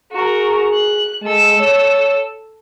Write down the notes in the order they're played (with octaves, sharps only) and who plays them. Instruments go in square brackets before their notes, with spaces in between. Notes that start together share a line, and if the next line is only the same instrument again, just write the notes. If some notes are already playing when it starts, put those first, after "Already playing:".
[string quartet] F#4 A#4 [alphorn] G#4
[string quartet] F#6
[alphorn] G#3 [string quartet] A4 E6
[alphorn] C#5